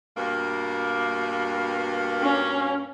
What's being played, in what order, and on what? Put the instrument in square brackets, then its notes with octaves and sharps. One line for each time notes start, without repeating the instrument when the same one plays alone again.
[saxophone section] G2 B2 A#3
[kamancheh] C#4